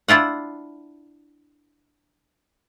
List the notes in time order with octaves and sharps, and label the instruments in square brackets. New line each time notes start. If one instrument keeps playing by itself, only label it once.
[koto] D4 E4 F4 F#5